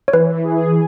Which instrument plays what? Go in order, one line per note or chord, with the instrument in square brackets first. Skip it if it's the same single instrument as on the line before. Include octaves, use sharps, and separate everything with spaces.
[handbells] C#5
[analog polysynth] E3 [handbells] B4
[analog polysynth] G#4